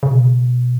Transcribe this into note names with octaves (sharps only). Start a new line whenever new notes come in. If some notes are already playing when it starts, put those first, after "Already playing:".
C#3
B2